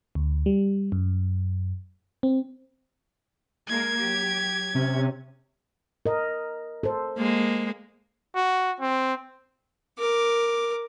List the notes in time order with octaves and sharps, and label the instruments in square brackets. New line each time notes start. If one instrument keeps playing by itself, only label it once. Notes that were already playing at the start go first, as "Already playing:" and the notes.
[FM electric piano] D2
G3
F#2
C4
[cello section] G#3 A#3 A#4 [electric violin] G#6
[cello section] F#3 G4
[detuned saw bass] C3 [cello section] C#4
[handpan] A#4 D#5
A4 C5
[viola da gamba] G#3 A#3
[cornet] F#4
C4
[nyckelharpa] A#4 D6